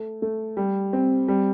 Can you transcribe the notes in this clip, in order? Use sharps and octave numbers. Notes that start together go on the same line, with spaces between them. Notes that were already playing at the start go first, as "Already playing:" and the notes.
Already playing: A3
A3
G3
C4
G3